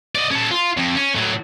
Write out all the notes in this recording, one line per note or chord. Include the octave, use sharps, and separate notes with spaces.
D5 D#5
C#4 A4
F4
F2
C#4
A2 F#3